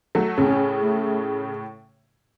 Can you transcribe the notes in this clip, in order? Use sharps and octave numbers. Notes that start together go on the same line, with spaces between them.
F#3 A3
A2 C#3 C#4
A3